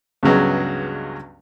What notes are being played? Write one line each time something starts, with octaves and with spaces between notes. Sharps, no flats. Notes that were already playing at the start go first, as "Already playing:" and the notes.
C#2 G2 C#3 F#3 G#3 B3